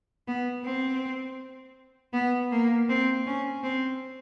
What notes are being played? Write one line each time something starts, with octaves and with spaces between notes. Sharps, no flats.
B3
C4
B3
A#3
C4
C#4
C4